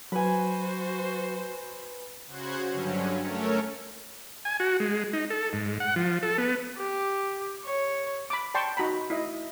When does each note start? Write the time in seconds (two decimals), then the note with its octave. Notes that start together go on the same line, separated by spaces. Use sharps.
0.12 F#3 F#4 B4 C5 G#5
2.27 C#3 F#4 C5 F#6 G#6
2.67 G2 D3 F#3 C#4
3.23 A3 C#4 A4 A#4 C#5
4.45 G#5
4.60 F#4
4.80 G#3
5.13 D#4
5.30 A4
5.53 G#2
5.80 F#5
5.96 F3
6.23 A4
6.38 B3
6.77 G4
7.64 C#5
8.30 B5 D6
8.54 D5 G5 A5 C6 C#6
8.77 D#4 F#4 A#5 B5
9.10 E4 D#5